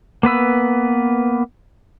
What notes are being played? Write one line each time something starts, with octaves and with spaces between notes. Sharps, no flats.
A#3 B3 B4 E6